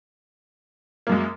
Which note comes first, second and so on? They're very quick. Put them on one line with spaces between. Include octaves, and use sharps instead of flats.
A#3 F#2 G#3